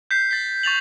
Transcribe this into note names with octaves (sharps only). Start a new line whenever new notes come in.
G6 B6 C7
A6 B6
C#6 A6 F7 F#7